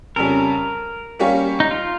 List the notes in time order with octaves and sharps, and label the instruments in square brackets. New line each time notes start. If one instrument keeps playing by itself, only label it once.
[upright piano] F2 C#3 G3 C#4 [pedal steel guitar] A#4
[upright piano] G3 A#3 C#4 G4 C#5
[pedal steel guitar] D#4
F4